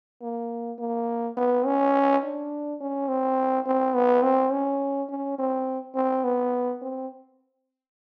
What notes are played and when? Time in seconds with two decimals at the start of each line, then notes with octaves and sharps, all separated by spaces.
0.22 A#3
0.79 A#3
1.37 B3
1.66 C#4
2.23 D4
2.80 C#4
3.08 C4
3.66 C4
3.95 B3
4.23 C4
4.52 C#4
5.09 C#4
5.38 C4
5.95 C4
6.24 B3
6.82 C4